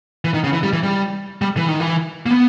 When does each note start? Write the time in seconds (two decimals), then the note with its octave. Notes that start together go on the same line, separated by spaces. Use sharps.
0.25 E3
0.34 D#3
0.44 C#3
0.53 E3
0.63 G3
0.73 E3
0.83 G3
1.42 G3
1.57 E3
1.68 D#3
1.80 E3
2.26 A#3
2.31 B3